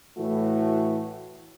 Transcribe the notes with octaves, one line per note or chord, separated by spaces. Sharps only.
A2 E3 A3 F#4